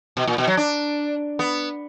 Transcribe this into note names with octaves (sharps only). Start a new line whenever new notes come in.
B2
A#2
B2
F#3
D4
B3